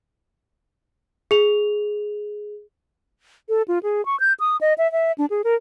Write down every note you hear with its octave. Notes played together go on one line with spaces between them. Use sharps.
G#4 F7
A4
F4
G#4
C#6
G6
D#6
D#5
E5
E5
D4
G#4
A#4